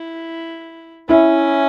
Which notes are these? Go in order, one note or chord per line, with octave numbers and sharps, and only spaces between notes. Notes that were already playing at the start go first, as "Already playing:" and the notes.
Already playing: E4
C#4 E4